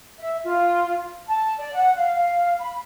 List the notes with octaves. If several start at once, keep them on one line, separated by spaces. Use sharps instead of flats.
E5
F4
A5
D5
F#5
F5
F5
B5